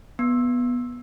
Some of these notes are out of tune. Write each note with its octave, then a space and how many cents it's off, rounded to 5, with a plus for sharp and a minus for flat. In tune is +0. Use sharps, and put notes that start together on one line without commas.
B3 -10